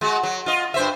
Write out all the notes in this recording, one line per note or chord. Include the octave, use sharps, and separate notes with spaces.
G#3 F#4
F#3
F4 D#5
G2 C5 E5